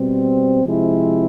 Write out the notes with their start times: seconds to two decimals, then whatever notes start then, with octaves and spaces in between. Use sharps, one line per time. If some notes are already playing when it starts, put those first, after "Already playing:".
Already playing: B2 G3 C4
0.65 C3 F3 G#3 C4 E4